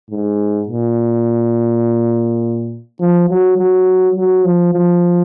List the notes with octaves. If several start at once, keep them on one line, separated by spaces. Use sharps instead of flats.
G#2
A#2
F3
F#3
F#3
F#3
F3
F3